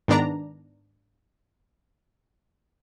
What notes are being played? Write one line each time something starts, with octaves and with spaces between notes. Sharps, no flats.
G#2 D#3 B3 D4 D5 A#5